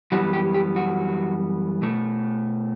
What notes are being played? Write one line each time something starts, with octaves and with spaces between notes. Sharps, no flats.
F#2 E3 G3 B3 F#4
G4
G4
F#4
B2 A3